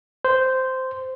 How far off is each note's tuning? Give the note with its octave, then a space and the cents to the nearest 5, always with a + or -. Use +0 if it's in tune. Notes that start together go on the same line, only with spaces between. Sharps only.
C5 -10